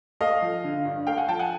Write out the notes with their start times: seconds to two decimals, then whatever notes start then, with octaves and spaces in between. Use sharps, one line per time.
0.20 A3 D#5 F5
0.42 F3
0.64 D3
0.85 G2
1.07 A3 F5 G5
1.17 F#5 G#5
1.28 F3 G5 A5
1.39 F#5 G#5